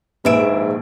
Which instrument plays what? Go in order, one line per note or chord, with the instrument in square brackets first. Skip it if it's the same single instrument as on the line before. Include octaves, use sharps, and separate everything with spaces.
[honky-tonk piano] A#1 D#2 D7 [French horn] G#2 [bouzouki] G#4 E5 [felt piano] B4